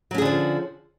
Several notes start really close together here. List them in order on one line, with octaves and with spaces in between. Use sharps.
F#3 C#4 G#4 D3 F3